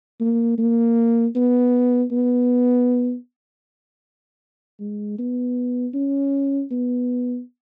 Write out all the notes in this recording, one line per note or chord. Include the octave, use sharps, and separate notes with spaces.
A#3
A#3
B3
B3
G#3
B3
C#4
B3